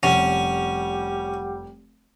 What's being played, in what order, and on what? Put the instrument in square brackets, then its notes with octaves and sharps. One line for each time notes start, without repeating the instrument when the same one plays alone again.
[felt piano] F1 [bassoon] G3 [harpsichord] C#4 [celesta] F#5